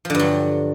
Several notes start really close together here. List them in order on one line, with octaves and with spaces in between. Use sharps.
F3 D3 G2 F#3